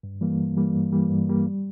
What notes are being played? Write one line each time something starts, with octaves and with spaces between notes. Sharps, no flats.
G2
E3 G3 A#3
G2
E3 G3 A#3
G2
E3 G3 A#3
G2
E3 G3 A#3
G3